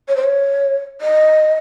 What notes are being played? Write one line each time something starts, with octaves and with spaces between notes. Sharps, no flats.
C#5
C5
C#5
D#5